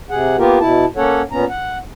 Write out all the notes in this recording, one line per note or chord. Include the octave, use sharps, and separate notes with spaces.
C3 G#4 F#5
A#3 B3 F4 G4 A#4
B2 E4 A5
A#3 C#4 A4 C#5 F#5
A#2 B3 C#4 A#5
F#5